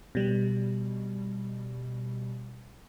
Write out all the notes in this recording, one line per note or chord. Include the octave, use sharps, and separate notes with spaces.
B2 G3